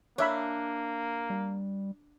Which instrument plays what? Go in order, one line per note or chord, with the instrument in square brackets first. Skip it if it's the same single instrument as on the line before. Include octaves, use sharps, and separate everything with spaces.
[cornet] A#3 [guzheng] D4 [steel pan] C#5 E5 B5
[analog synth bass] G3